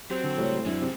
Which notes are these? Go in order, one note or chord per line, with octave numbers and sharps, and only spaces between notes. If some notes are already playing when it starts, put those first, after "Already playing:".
F#3 C4 G4
D3
C#2 A2 G3 C#5
F#2 G#3 C4 D4 E4
C3